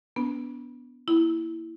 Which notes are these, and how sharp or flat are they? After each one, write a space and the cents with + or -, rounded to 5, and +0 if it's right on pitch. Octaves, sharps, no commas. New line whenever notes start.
B3 +0 D4 -30 B4 +0
A#3 +0 E4 +0